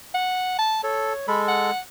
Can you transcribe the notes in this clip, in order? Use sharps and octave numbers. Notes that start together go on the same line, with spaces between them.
F#5
A5
A4 C#5
G#3 A4 B5
F#5